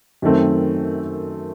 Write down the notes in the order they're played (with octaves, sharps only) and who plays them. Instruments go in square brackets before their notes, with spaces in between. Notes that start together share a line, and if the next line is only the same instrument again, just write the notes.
[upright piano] F#2 D#3 A3 C4